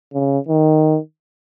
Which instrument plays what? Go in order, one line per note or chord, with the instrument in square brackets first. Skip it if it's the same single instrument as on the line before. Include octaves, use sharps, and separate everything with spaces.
[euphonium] C#3
D#3